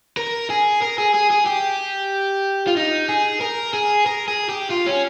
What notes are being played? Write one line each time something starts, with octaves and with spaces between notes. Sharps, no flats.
A#4
G#4
A#4
G#4
G#4
G#4
G4
F4
D#4
G#4
A#4
G#4
A#4
G#4
G4
F4
C#4